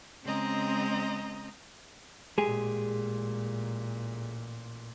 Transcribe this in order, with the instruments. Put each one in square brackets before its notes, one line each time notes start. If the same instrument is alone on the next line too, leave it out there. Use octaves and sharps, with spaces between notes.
[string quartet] C#3 G#3 C4 D#5 A#5
[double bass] A1 A#2 [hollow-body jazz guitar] G#3 G4 G#4